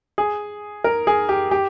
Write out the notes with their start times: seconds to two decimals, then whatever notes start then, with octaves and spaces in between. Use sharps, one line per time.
0.18 G#4
0.84 A#4
1.07 G#4
1.29 G4
1.51 G4